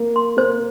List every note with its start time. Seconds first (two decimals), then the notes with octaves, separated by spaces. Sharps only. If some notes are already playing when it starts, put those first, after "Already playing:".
Already playing: A#3
0.16 C6
0.37 A#3 C5